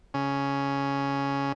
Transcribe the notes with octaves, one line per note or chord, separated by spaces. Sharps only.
C#3 C#4